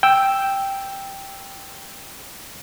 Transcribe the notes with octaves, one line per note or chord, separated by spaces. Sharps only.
G5 E6